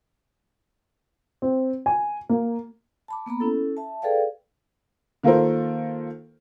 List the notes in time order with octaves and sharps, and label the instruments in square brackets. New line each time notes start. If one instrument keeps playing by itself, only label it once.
[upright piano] C4
G#5
A#3
[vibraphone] A5 B5 D6
A#3 B3 A#5 B5
C#4 E4 A4
E5 A5
G#4 A4 B4 D5 F5 G5
[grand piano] D#3 A#3 F4 A4 A#4 C5